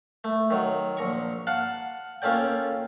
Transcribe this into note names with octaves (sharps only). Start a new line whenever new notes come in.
A3
D#3 F#3
A#1 A#5 C#6
F5 F#5 A5
A#3 C#4 F4 A4 D5 G5